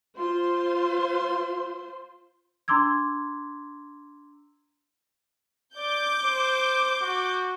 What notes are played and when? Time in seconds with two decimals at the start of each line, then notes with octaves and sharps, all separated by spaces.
0.17 F4 C5 C6
2.68 D4 A#5 C6 D6 E6 G#6
5.76 D5 D6 G6
6.24 C5
7.02 F#4